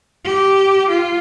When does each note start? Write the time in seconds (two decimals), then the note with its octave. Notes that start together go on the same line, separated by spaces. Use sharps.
0.24 G4
0.90 F4